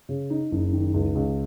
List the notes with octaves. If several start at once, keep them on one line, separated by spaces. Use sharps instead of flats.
C#3
D#4
F#1
D#3
C#2
C#2